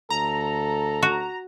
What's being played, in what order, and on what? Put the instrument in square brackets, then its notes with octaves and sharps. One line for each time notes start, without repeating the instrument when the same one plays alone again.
[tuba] D2 [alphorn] A4 [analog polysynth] A#5
[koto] F#4